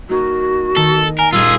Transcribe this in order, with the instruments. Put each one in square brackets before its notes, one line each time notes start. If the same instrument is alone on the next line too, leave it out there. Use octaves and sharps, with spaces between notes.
[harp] A#3 D#4 A#4 [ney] F#4
[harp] D#3 D#4 A#6 [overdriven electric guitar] A4
[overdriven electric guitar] A#4 [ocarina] G#5
[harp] A#2 G3 G4 [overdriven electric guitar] F4 G#4 [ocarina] E6